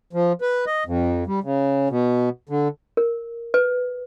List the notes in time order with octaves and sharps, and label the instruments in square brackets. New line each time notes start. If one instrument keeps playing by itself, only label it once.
[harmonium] F3
B4
D#5
F2
G3
C#3
B2
D3
[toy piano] A#4
B4